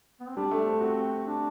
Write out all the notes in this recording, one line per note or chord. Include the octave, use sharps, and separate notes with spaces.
B3
C4
G3 D4
A3
C4
C4 F#4
D4